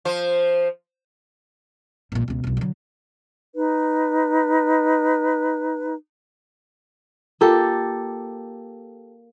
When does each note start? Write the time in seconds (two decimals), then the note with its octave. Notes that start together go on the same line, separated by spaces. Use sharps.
0.05 F3 C5
2.12 A#1 A#2
2.28 C#2 B2
2.44 E1 B1
2.57 D3 F#3
3.56 D#4 B4
7.41 A#3 F4 G4 A4